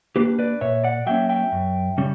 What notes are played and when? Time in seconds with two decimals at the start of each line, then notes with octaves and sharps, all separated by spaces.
0.16 A#3 D4 G4 B4
0.39 B4 D5
0.61 A#2 C#5 E5
0.84 D5 F#5
1.06 F#3 A#3 C#4 E5 G5
1.29 E5 G5
1.52 F#2
1.97 C#3 G3 C#4